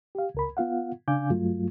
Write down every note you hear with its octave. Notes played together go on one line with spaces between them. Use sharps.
G4 F5
C#2 A#4 B5
B3 F4 F5 F#5
C#3 D4 F5 G#5 D6 G6
G2 F#3 A3 F4